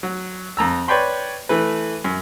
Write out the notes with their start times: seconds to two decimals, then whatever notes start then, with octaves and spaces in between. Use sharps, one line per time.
0.03 F#3
0.57 F2 A#5 E6
0.88 B4 C#5 D5 G5 B5 C6
1.49 E3 A3 B4
2.04 F#2